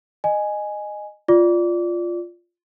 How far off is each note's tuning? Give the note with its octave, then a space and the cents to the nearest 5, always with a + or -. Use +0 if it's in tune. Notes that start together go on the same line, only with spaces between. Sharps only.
D#5 -20 G#5 +0
F4 +0 D5 +0 D6 -30